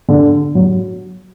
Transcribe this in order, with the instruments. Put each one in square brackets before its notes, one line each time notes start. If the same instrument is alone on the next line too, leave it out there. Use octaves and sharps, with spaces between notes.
[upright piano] D3
F#3